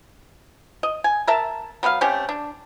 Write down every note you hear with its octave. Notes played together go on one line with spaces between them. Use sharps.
D#5
G#5
A#4 E5 A5
F#3 B3 G#4 F5
A3 C4 C#4 G4
D4